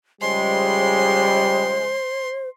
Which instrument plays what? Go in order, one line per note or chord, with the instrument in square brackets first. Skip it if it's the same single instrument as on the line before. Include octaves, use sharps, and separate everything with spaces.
[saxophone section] C#3 F3 G#3 [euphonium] G3 [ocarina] C5 [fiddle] C6